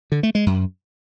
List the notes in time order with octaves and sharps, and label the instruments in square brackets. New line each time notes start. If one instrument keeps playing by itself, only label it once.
[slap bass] D3
A3
G#3
F#2